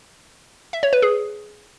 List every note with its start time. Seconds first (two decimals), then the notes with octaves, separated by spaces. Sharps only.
0.73 E5
0.83 C#5
0.93 B4
1.02 G#4